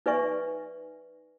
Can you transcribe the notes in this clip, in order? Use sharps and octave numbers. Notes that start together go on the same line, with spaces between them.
D#4 B4 D5 E5 G#5 C#6